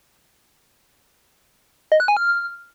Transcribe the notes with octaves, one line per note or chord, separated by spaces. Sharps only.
D#5
F#6
G#5
F6